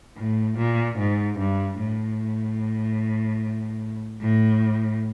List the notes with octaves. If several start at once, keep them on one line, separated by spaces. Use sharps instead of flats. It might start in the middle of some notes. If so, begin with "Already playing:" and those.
A2
A#2
G#2
G2
A2
A2